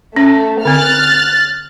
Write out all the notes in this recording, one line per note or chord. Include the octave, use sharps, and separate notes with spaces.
A3 C#4
D3 C4 F6 F#6 A6